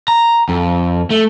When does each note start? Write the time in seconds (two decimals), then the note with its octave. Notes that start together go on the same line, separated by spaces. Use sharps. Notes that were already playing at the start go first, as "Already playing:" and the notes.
0.08 A#5
0.49 F2
1.10 A3